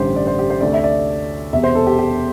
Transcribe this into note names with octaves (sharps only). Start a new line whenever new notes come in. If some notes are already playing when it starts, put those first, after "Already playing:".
Already playing: A1 G2 D3 G3 G4 C5
D5
C5
G4
C5
D2 C3 A3 D5
E5
D5
E1 E2 C3 E5
C5
A4
G4
G4